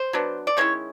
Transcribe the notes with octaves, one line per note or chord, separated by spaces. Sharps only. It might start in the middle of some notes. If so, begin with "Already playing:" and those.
Already playing: C5
F#3 B3 D4
D5
D#3 G#3 C#4 E4 C#5